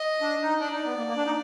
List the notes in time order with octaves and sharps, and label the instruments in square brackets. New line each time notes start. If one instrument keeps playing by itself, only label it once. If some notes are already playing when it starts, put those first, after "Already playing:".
Already playing: [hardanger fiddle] D#5
[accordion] D4
D#4
[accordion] D4 [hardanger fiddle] D5
[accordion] D#4
B3
A#3
A#3
D4
D#4